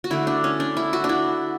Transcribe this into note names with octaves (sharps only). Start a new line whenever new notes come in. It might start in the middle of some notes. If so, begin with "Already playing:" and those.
F#4
D3 A3 E4
D4
C#4
D4
E4
F#4
D4
E4